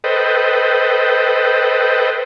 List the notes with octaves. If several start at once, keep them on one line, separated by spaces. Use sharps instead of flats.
A4 B4 C5 D#5 G5